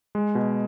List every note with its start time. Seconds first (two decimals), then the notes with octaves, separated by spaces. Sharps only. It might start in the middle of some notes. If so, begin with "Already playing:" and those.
0.15 G#3
0.35 B2